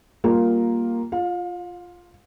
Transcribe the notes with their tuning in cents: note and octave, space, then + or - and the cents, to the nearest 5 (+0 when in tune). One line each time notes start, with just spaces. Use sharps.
G3 +0 A#3 +0 F4 +10
F4 +0 F5 +35